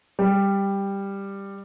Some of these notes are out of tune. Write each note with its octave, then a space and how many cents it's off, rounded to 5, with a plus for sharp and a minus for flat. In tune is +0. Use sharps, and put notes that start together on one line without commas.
G3 +10